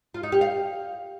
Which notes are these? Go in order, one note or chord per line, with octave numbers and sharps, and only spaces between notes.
F4
D#4
G4
F5